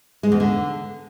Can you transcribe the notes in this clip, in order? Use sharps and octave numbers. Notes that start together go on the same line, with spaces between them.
G#3
E2
D3